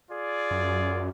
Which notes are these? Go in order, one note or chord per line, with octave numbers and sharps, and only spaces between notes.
F4 G#4 D5
F#2